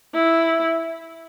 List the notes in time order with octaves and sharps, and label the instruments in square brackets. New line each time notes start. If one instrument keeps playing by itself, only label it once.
[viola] E4